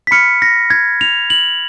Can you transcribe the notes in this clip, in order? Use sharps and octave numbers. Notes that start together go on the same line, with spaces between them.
B6
B5 F6 C#7
A#6
G#6
F7
F#7